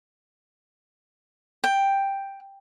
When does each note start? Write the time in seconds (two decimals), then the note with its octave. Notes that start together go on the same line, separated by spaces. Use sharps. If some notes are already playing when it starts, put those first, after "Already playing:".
1.64 G5